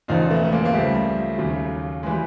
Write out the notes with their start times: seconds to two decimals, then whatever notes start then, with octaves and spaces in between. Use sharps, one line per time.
0.08 E1 E2 C#3 F3 D#4 F4
0.31 A3 B3
0.45 B3
0.52 G#3 A#3
0.65 A#3
0.73 C#2 C#3 F3 G3 A3
1.38 D#2 C#3 F#3
2.03 G#3
2.06 E3 G3